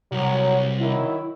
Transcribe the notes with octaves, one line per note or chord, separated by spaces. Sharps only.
C2 F#3
D#3 F#3 E4